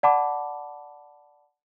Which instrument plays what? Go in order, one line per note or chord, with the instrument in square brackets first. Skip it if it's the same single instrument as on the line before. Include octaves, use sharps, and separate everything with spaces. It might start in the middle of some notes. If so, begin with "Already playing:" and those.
[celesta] D5 F#5 A5 B5 D6